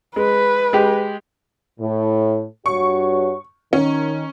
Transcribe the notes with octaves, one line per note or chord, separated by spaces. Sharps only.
G#3 B4
G#3 G4
A2
G2 F#4 C#5 C#6
D#3 C#4